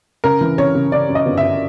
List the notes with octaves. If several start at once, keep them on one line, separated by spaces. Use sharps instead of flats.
C#3 A#4
E3
C#3 C#5
C#3
C#3 D5
F#2
D#5
G1
E5
F#2